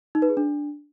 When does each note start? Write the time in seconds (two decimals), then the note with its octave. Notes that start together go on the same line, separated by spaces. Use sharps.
0.15 D#4
0.22 B4
0.30 G#4
0.37 D4